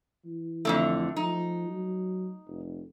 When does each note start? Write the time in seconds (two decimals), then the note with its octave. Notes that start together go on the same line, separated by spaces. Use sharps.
0.25 E3
0.65 F2 D3 A3
1.16 F3 D#4
1.69 F#3
2.47 F1